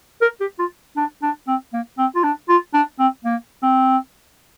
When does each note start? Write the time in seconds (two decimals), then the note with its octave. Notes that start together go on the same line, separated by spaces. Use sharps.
0.22 A#4
0.40 G4
0.59 F4
0.97 D4
1.22 D4
1.48 C4
1.73 A#3
1.98 C4
2.16 F4
2.24 D4
2.49 F4
2.74 D4
2.99 C4
3.24 A#3
3.63 C4